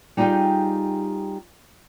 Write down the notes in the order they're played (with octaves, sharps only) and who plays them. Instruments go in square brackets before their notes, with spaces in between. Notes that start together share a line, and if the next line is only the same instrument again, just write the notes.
[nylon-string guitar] G3 D#4 F4 G4 G#4 G5